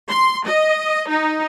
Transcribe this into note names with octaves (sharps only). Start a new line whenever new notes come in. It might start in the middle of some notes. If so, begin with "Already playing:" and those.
C6
D#5
D#4